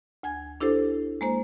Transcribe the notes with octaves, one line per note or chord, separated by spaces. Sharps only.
D2 G#5 G#6
D4 E4 G4 A4 C5
G#3 A#3 C5